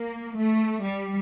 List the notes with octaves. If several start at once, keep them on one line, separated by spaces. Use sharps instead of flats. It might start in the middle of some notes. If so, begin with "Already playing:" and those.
Already playing: A#3
A3
G3